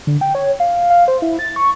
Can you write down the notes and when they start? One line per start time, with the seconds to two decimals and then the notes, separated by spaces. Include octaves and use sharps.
0.07 D3
0.21 G5
0.35 C#5
0.60 F5
0.90 F5
1.08 C5
1.22 E4
1.39 A6
1.56 C#6